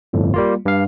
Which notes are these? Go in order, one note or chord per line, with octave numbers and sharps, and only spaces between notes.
G1 F2 A2
G3 A#3 F4
G2 F5